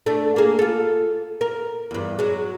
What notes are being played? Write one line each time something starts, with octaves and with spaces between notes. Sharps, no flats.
A3 D4
A#3 G#4
F4 A4
A#4
E2 G2
F#3 G#3